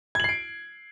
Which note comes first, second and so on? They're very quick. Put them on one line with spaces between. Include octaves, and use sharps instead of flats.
G#6 F#7 C7 D7